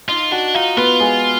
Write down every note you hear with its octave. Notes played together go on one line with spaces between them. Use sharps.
D#4 F4 D#5
D4 F#4 F#5
D#4 F4 F5
B3 F4 B4
G#3 G#4